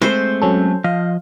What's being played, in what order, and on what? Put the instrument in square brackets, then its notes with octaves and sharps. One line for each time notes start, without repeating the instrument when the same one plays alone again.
[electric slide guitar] G#3 A3 C4 [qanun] C5
[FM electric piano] F#3 C#4 A4
[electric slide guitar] F3 D#5 [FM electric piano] F5